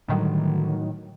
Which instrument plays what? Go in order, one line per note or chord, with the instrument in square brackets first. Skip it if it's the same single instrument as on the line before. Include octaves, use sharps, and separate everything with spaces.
[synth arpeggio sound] A2 D#3 F#3 [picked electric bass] D3 G3